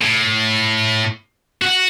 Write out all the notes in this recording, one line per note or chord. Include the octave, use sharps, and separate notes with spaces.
A2
F#4 F#5